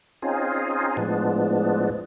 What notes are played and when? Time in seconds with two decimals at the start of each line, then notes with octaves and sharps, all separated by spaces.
0.22 C4 C#4 D#4 F4 G#4
0.97 A2 F3 G#3 B3 D4